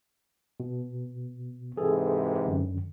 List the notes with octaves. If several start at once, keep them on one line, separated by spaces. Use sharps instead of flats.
B2
G#2 C3 E3 G#4 A4
F#2 D3